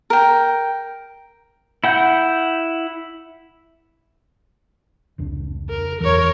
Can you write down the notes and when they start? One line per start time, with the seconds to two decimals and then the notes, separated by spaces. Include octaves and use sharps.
0.10 A#4 G5
1.84 E4 F#5 G6
5.18 F1 C#2 D4
5.69 A#4
6.01 F#1 E2 E3 A#4 C#5